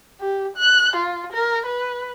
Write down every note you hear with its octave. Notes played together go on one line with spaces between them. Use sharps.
G4
F#6
F4
A#4
B4